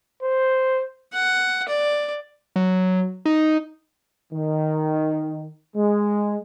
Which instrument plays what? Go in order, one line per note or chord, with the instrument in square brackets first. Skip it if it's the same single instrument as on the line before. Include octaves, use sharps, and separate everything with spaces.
[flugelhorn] C5
[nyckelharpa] F#5
D5
[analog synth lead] F#3
D#4
[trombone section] D#3
G#3